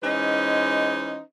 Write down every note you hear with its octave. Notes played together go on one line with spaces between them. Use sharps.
E3 G#3 C#4 D#4 C5 D#5